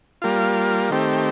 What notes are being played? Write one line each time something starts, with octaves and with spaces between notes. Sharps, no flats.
G3 A#3 F4
D#3 A3 C4 G4